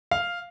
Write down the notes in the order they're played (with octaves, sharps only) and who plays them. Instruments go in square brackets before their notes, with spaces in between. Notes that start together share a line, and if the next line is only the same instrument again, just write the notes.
[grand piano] F5